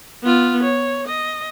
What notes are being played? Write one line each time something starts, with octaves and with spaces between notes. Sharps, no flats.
B3 F4
C#5
D#5